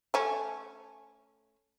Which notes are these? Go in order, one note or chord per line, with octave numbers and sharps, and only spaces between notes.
A3 C#4